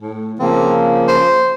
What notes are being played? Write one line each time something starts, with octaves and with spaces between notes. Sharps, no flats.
A2
C#3 F3 A#3 C4
C5